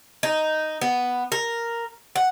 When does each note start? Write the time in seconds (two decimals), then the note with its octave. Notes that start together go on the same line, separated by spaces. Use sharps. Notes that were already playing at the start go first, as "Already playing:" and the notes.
0.23 D#4
0.81 B3
1.32 A#4
2.16 F#5